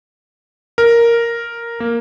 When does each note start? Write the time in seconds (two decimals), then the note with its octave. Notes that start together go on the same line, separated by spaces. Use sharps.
0.78 A#4
1.80 A#3